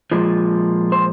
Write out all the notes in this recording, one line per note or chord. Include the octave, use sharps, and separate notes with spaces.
A#2 F3 G#3
C5